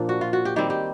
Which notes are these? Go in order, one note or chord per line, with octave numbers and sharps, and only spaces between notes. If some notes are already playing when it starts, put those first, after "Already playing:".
Already playing: A#2 F3 A#3 D4
F#4
F4
F#4
G4
D#3 G3 C4 G4
G4